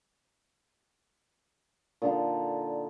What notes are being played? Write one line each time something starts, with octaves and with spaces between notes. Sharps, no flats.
A#2 D3 D#4